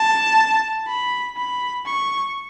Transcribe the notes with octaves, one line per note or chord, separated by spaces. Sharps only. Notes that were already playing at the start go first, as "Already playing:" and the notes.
Already playing: A5
B5
B5
C#6